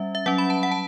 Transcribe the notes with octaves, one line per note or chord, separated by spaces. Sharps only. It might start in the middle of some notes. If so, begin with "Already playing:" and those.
Already playing: G3 C#4 E5
E5
F#3 C#4 F#5
B5
A5
F#5
A5